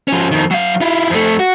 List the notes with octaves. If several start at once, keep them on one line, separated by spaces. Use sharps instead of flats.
F3 C#4
F2 D#3
F#3 F5
E4 F4
F2 A3
F#4